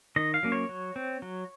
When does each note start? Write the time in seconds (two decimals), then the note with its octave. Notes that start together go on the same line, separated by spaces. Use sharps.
0.16 D#3 D#5
0.34 F5
0.43 F#3 A#3 C#4
0.52 C#5
0.69 F#3
0.96 C4
1.22 F#3